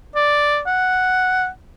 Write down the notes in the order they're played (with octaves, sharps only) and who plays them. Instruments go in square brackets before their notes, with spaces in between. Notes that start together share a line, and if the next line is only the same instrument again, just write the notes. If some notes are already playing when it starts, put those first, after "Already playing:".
[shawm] D5
F#5